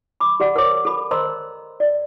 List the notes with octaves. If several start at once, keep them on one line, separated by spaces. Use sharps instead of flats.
B5 D6
G4 D5 F#5
A#4 C5 C#5 D6
A4 B5
A#4 C5 D#5 A#5 C6 E6
D5